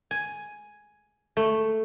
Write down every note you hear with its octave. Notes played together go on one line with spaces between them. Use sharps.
G#5
A3